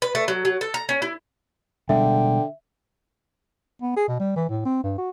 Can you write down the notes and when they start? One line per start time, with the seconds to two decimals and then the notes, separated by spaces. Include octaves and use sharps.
0.02 B4
0.15 A3
0.28 F#3
0.45 F#3
0.61 A4
0.74 A#5
0.89 C#4
1.02 E4
1.89 B2 D3 G3 G#3 E5 G5
3.82 B3
3.96 G#4
4.08 B2
4.19 G3
4.36 E3
4.49 A2
4.65 C4
4.84 G2
4.98 F#4